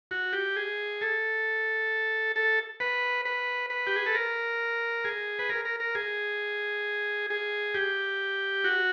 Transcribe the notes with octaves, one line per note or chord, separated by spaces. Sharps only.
F#4
G4
G#4
A4
A4
B4
B4
B4
G4
G#4
A4
A#4
G#4
B4
A#4
A#4
A#4
G#4
G#4
G4
F#4